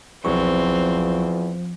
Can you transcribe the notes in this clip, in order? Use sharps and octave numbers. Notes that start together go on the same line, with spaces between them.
B1 E2 F3 F#3 C4 C#6